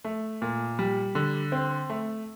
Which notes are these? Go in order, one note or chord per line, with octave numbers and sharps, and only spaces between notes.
A3
A#2
G3
D3
C4
A3